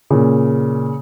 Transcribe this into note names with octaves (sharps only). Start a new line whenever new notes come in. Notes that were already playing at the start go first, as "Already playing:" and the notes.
A#2 C#3